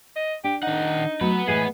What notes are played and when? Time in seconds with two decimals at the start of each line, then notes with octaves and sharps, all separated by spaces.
0.16 D#5
0.44 D4 G4
0.63 D#3 D#4 F#5
1.21 F#3 A3 B3 B4
1.48 A2 E3 G#3 G#4